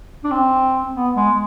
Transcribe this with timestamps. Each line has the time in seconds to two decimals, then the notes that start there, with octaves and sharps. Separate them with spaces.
0.24 D4
0.31 C4
0.94 B3
1.16 G#3